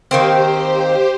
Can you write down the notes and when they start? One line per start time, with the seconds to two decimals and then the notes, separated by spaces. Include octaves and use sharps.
0.11 D#3 A#3 C4 G4 C5